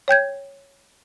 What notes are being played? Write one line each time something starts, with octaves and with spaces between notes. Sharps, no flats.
C#5 G5 G6 G#6